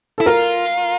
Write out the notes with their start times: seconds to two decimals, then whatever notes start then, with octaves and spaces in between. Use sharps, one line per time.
0.18 E4 A4
0.26 F4 A#4